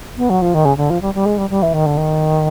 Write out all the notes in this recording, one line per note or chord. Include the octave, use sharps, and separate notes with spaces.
B3
F#3
F3
D#3
C#3
D3
F3
G3
G3
G#3
G3
G3
E3
D#3
D3
D#3